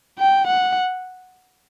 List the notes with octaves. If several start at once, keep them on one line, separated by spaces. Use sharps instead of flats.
G5
F#5